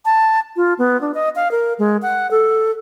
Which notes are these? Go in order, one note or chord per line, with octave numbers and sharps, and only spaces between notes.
A5
F4
B3
D4
D#5
F5
A#4
G#3
F#5
A4